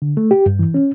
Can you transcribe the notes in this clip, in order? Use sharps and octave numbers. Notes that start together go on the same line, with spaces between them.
D3
A3
G4
G2
E3
C#4